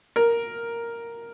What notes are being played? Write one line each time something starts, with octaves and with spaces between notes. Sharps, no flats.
A#4